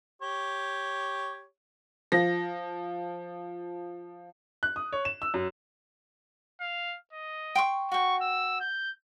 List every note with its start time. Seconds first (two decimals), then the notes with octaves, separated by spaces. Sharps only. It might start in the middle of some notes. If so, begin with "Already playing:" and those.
0.22 G4 C#5
2.12 F3 A#6
4.63 F#6
4.76 D#6
4.93 C#5
5.05 E7
5.22 E6
5.34 F#2
6.61 F5
7.13 D#5
7.55 G5 C6 C#6
7.92 F#4 G5 C#6
8.22 E6
8.60 G6